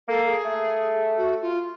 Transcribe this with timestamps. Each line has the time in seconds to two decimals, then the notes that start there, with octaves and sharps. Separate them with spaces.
0.08 A#3 A4
0.26 A4
0.30 G#4
0.45 A3
1.17 F#4
1.42 F4